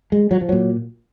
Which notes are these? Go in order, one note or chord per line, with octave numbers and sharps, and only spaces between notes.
G#3
F#3
F3
A#2 F#3